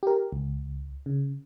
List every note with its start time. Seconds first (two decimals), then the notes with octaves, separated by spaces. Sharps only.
0.03 G4 A#4
0.32 C#2
1.06 C#3